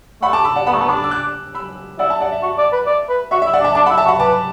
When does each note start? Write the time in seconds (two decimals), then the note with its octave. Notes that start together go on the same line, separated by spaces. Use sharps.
0.22 A3 F#5 B5
0.33 A5 D6
0.44 B5 E6
0.56 D5 F#5
0.67 B3 F#5 B5
0.74 A3
0.81 B3 A5
0.89 D4 B5
0.97 D6
1.04 E6
1.11 D6 F#6
1.55 B5 E6
1.99 E4 D5 F#5
2.10 E5 A5
2.21 D5 F#5
2.32 E5
2.43 F#4
2.58 D5
2.73 B4
2.87 D5
3.09 B4
3.31 F#4 E5
3.42 E5
3.46 E4
3.53 D5 F#5
3.61 D4
3.64 E5 A5
3.75 D4 A5 D6
3.86 F#5 B5
3.90 E4
3.97 E5 A5
4.05 F#4
4.08 F#5 B5
4.20 B4 A5 D6